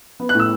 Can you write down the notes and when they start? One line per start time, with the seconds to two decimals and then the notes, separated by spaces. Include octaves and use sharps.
0.20 B3
0.29 F#6
0.35 A2 E6